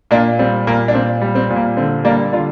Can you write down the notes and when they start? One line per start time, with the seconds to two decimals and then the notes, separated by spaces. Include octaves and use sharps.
0.11 A#2 A#3 D4
0.39 G3 C4
0.67 A#2 A#3
0.88 D4
0.94 A#2 C4
1.21 G3
1.35 C4
1.50 A#2
1.56 A#3
1.77 D3 C4
2.05 G3 A#3 D4
2.32 D3 D4 F4